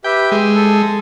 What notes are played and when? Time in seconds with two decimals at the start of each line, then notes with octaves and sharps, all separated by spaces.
0.04 G4 B4 E5 G5
0.32 G#3
0.55 A4